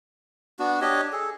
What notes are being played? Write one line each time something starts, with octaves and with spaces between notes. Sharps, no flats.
B3 D4 F#4
D4 G4 C#5 D#5
G#4 A4